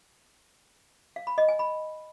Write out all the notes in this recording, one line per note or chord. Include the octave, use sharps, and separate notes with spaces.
F5
B5
D#5
G#5
B5